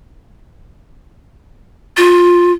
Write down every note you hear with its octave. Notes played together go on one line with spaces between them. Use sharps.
F4